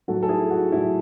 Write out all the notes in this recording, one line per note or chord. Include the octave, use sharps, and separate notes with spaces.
A2 F#3 A3 F#4 A4
A4
E4 G#4
F#4
A2 F#3 A3 E4